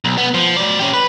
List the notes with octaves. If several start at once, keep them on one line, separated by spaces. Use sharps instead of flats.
B1
B3
F3
F#3 D5
C#4 G4
B4